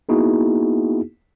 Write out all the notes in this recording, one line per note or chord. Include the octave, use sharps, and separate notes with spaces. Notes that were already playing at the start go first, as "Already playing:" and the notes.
A#3 B3 D#4 E4 F#4 G#4